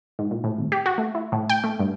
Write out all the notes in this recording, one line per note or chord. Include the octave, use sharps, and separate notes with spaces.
G#2
A#2
A2
G#1
G4
F#4
A3
E4
A2
G5
A3
G2